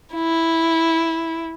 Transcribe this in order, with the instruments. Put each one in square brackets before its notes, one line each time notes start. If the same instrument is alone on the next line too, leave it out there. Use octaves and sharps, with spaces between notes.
[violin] E4